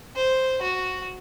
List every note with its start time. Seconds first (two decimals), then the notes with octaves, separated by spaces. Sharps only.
0.16 C5
0.62 F#4